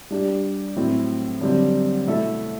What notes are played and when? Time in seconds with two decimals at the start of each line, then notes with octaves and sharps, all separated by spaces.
0.10 G3 D4 G4
0.76 A2 F#3 C4 E4
1.41 F#2 D3 G3 C4
2.07 B2 A3 E4 A4 E5